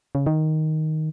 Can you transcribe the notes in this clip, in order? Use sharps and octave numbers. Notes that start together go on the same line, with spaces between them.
C#3
D#3